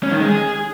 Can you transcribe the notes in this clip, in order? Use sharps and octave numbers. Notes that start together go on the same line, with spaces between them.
C#4
D#3
G#3
G#4